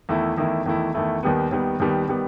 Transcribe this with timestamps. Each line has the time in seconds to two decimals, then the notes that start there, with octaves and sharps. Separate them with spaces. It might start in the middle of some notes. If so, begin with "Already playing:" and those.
0.09 E2 D#3 A3 E4
0.37 E2 D#3 A3 E4
0.66 E2 D#3 A3 E4
0.94 E2 D#3 A3 E4
1.23 D#2 D#3 G3 B3
1.51 D#2 D#3 G3 B3
1.80 D#2 D#3 G3 B3
2.08 D#3 G3 B3